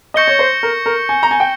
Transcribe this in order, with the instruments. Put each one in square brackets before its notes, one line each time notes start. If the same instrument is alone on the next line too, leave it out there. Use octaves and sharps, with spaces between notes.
[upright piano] D#5 [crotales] C#6 G6 A#6 C#7 G7
[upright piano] C#5
C5
A#4
A#4
G#5
A#5
G#5
G5